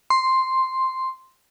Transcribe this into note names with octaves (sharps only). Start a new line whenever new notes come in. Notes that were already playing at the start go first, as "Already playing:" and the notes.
C6